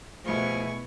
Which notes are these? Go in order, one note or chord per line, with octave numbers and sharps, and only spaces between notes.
B2 F3 A3 E4 G#4 C#6